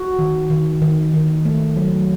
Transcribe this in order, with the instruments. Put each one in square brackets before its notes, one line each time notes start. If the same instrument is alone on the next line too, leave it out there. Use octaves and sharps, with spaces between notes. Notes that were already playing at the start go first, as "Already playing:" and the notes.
Already playing: [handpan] F#4
D#3
D#3
D#3
D#3
A3
F#3